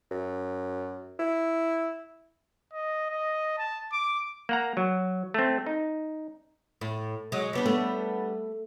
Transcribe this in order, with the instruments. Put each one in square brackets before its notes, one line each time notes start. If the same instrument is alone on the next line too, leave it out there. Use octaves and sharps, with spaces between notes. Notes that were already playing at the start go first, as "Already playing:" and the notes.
[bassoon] F#2
E4
[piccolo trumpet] D#5
D#5
A5
D6
[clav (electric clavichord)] A#3 F#5 A#5
F#3
A3 C4
D#4
[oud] A2
F#3 G#3
G3 B3 D4
[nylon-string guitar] A3